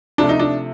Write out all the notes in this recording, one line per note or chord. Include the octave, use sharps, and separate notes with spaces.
C3 F3 A3 D4
D#4
D4